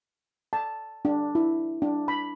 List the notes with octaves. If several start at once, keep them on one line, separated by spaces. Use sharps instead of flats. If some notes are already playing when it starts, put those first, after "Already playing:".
A5
D4
E4
D4
B5